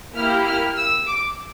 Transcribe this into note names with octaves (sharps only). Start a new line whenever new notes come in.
A#3 E4 G4 F6
F6
E6
D6